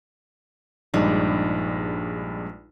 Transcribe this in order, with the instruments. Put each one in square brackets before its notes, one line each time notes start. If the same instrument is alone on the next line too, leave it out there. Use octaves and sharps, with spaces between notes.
[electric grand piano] A#1 G2 G#3 [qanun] D4 D#4